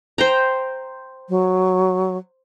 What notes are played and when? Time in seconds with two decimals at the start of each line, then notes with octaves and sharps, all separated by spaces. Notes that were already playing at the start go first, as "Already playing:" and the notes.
0.18 C5 G5 A#5
1.29 F#3